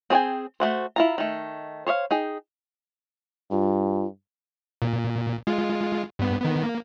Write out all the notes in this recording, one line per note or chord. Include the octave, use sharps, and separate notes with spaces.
C4 G#4 C#5 G5 G#5
A3 A#3 F#4 C5
E4 F4 A#5
D#3 A3
C5 C#5 D#5 F5
D#4 G#4 G5
G2 F4
A#2
G#3 F4
G2 B3
D#3 B3
A#3